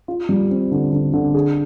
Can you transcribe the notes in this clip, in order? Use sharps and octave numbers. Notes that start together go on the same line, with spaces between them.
F4
G3
C4
D3
D3
D3
G#4